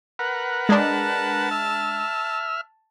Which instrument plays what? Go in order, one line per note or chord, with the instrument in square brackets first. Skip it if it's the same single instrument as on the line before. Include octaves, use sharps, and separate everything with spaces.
[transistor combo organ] A#4 B4 F#5
[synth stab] G#3 D4 [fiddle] A5
[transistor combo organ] E5 F6